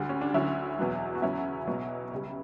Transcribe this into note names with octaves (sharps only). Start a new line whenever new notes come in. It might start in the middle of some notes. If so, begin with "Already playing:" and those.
Already playing: D2 D3 G3
C#4
D4
D2 D3 F#3 C#4 E4
E2 B2 F#3
F#4
E2 C#3 F#3 C#4 E4
B1 B2 F#3
C#2 C#3 G3